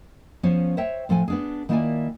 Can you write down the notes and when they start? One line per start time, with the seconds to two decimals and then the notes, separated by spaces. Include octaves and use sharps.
0.43 F3 B3 C#4 F4 C5 C#5
0.77 C5 C#5 E5 G5
1.09 A2 F3 A4 F#5 G#5
1.28 B3 D4 G#4
1.69 D#3 A#3 E4 F4 D5 G#5